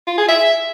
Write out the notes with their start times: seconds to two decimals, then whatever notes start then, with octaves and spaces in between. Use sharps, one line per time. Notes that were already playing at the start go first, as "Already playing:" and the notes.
0.07 F4
0.18 G#4
0.29 E5